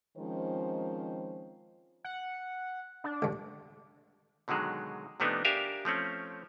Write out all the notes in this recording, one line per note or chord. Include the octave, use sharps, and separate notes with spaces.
D#3 F3 G#3 C4 C#4 C5
F#5
D4
C#2 G2
B2 D3 D#3 F#3 G#3
C3 F3 A3 B3 D4 D#4
D4 G4 A#4 E5 F5 G#5
F3 A3 C4 C#4